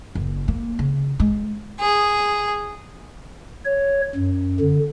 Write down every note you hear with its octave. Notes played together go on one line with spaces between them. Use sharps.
F#1
A#3
C#3
G#3
G#4
C#5
F#2
D3